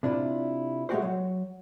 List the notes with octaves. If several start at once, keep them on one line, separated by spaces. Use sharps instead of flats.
C3 D4 E4 F4
G#3 A3 B3 F#4 G4 C5
F#3